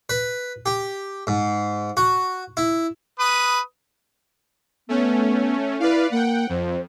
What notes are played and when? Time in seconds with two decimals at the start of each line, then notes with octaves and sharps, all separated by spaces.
0.10 B4
0.66 G4
1.27 G#2
1.97 F#4
2.57 E4
3.19 B4 D#6
4.89 A3 B3 C#4
5.80 E4 B4 D5 F5
6.11 A#3 F#5 G5
6.49 F2 C5